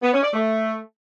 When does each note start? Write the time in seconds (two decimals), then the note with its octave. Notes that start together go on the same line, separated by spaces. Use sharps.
0.02 B3
0.13 C#4
0.23 D5
0.33 A3